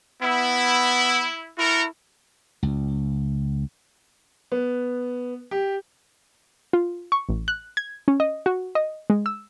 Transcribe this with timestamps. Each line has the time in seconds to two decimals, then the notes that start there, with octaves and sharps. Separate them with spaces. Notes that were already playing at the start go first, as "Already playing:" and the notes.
0.22 B3 E4
1.58 E4 F#4 A4 A#4
2.63 C#2
4.52 B3
5.51 G4
6.73 F4
7.12 C#6
7.29 A1
7.48 F#6
7.77 G#6
8.08 C#4
8.20 D#5
8.46 F#4
8.75 D#5
9.10 G#3
9.26 E6